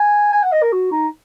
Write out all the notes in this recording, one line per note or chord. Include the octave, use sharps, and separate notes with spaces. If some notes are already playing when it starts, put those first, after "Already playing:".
Already playing: G#5
G#5
F#5
D#5
A#4
F#4
D#4